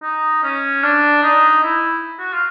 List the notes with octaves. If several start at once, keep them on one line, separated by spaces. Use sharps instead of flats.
D#4
C#4
D4
D#4
E4
F#4
F4